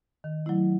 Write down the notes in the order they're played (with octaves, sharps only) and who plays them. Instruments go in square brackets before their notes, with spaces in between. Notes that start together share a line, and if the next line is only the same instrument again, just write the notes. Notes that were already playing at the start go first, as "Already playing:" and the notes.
[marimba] D#3
F#3 A3 E4